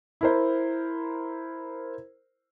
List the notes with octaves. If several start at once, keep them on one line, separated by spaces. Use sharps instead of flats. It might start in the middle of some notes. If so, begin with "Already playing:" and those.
E4 A#4 C5